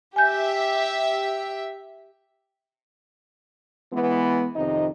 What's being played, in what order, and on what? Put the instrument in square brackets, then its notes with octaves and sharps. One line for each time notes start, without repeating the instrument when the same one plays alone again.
[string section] G4 E5 [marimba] G#5 G6
[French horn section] E3 G#3 B3
F2 C3 D#3 D#4 D#5